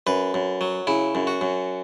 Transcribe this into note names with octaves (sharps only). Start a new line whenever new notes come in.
F#2 B4
F#2
F#3
C#3 E4
F#2
F#4
F#2